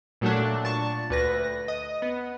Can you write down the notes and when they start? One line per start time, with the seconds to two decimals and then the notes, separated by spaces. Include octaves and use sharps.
0.21 A#2 F#3 A3 D4
0.64 A#2 A5 C#6
1.10 D2 B4 A#6
1.68 D#5
2.02 B3